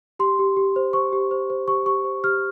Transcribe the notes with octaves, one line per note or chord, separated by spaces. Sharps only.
G4 C6
G4
G4
C5
C5 C#6
G4
C5
C5
G4 C#6
G4 C#6
C5
G4 F6